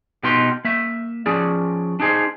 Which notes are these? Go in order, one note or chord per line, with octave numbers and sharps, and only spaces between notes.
B2 B3 D#4 F4 G4 C6
A#3 E5
F3 C#4 G#4 D5
D4 D#4 G#4 C5